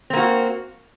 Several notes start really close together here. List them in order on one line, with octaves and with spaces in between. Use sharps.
C4 A#3 F#4